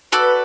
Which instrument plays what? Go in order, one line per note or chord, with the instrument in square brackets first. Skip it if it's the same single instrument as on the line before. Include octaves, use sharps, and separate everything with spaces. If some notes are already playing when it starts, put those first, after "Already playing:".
[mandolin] F#4 A4 D5 [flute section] B4